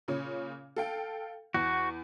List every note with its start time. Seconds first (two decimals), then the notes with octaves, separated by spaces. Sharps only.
0.08 A#2 C#3 C#4
0.76 A4 F5 G5
1.54 E2 F#4